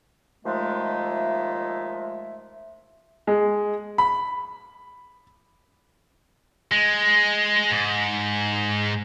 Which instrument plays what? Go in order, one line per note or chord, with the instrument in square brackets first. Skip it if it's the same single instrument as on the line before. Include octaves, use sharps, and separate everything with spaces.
[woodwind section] D#2 F3 G#3 A3 E5
[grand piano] G#3
B5
[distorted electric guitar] G#3
G#2